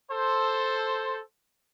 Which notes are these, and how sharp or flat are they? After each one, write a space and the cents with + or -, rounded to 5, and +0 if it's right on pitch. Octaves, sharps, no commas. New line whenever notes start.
A4 +0 C5 +5